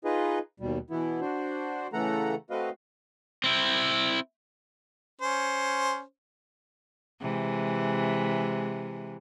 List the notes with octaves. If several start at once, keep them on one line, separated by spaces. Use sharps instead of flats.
D#4 F4 G#4 B4 D#5
D#2 B2 G3
B2 E3 B3 E4
D4 F#4 C5
C#3 E3 A3 A4 F#5 A#5
A3 C4 F#4 B4 D#5 F5
C4 E4
C#4 C5
C3 E3 G#3